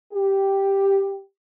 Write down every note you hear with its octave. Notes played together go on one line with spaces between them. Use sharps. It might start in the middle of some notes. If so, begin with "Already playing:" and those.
G4